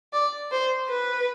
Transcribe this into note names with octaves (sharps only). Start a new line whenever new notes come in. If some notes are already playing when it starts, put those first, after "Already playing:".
D5
C5
B4